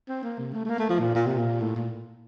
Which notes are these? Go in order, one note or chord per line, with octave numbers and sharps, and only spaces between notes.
C4
A#3
C3
A3
A3
A#3
A3
F3
A#2
A#2
C3
A#2
A2
A#2